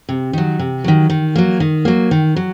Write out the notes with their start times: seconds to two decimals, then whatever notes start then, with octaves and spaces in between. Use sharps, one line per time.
0.09 C3
0.33 D#3 F#3
0.59 C3
0.84 D#3 F#3
1.10 D#3
1.36 F#3 A#3
1.60 D#3
1.85 F#3 A#3
2.11 D#3
2.36 F#3